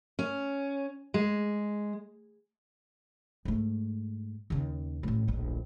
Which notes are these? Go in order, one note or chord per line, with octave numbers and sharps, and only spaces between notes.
C#4
G#3
G#2 A3
D#2 C#3
A1 A2
D1 A#1